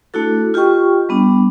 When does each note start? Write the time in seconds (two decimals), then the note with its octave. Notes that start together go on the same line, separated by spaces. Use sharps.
0.14 A3 D4 E4 F#4 A4
0.54 F4 G4 D#5 G5 C#6
1.09 G3 B3 D4